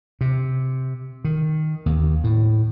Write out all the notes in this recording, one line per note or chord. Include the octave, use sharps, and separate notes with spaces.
C3
D#3
D#2
A2